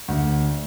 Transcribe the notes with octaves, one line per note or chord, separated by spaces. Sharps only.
D2